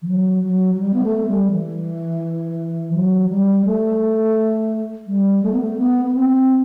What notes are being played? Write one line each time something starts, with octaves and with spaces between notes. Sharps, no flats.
E3
F#3
F#3
F#3
G3
B3
A3
G3
E3
F#3
G3
A3
G3
A3
B3
A3
B3
B3
C4